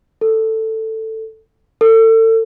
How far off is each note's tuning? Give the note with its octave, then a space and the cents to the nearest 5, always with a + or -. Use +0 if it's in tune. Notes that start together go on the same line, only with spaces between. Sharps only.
A4 +10
A4 +35